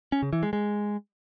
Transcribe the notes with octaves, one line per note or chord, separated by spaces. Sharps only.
C#4
C#3
E3
G#3
G#3